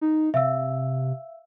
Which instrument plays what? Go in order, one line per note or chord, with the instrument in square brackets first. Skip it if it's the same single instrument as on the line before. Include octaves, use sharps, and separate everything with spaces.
[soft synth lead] D#4
[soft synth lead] C3 [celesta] E5 F5 E6